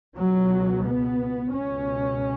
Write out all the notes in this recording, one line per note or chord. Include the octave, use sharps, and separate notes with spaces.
C#2 B2 F#3
B3
C#2 B2 C#4